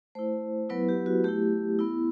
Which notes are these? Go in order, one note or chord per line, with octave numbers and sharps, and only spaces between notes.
A3 E4 C5
F#3 B3 E4 B4
G4
F#4
A3 E4 G4
B3 E4